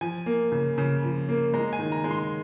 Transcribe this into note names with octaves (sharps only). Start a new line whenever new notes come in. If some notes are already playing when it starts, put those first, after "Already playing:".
F3 G#5
A#3
C#3
C#3
F3
A#3
G#3 A#5
G#5
D#3
A#5
G#3
C6